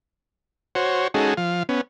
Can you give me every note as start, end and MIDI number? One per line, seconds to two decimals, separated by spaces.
0.75 1.08 66
0.75 1.08 72
0.75 1.08 73
1.14 1.34 56
1.14 1.34 61
1.14 1.34 63
1.14 1.34 66
1.14 1.34 68
1.14 1.34 69
1.37 1.63 53
1.37 1.63 77
1.69 1.81 59
1.69 1.81 61